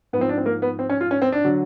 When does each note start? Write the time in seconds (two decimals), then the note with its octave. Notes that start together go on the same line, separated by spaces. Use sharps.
0.13 G#2 B3
0.17 F3 C4
0.29 D4
0.38 C4
0.46 A#3
0.62 B3
0.79 C4
0.90 C#4
1.01 F4
1.11 C#4
1.22 C4
1.32 D4
1.44 D3 F#3